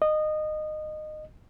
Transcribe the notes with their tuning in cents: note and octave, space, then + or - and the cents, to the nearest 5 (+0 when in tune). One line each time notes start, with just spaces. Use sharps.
D#5 -20